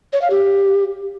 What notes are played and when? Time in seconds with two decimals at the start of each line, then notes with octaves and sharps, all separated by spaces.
0.13 C#5
0.22 F5
0.30 G4